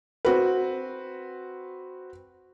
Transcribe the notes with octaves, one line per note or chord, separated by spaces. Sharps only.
C4 F#4 B4